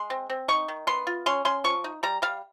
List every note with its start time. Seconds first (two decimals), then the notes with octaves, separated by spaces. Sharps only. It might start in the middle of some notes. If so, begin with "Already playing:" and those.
Already playing: G#3 C6
0.10 C4
0.30 C4
0.48 D#4 C#6
0.68 D#3
0.87 B3 C6
1.07 F4
1.26 C#4 C6
1.45 C#4 C6
1.64 F3 C#6
1.84 D#4
2.03 G3 A#5
2.22 G3 F5